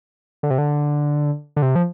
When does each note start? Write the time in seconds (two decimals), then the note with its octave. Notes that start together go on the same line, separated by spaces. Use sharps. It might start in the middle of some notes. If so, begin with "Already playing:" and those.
0.43 D3
0.50 C3
0.58 D3
1.57 D3
1.62 C3
1.75 F3